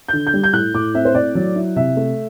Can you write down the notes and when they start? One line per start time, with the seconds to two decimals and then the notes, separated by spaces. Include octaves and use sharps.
0.08 G6
0.13 D3
0.27 G6
0.34 G3
0.44 G6
0.53 A2 F#6
0.74 A2 D6
0.94 C4 E5
1.05 C5
1.14 A2 D5
1.35 F#3
1.56 E4
1.76 C3 E5
1.97 A3